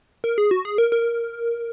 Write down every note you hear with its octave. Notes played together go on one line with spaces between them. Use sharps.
A#4
G#4
F#4
G#4
A#4
A#4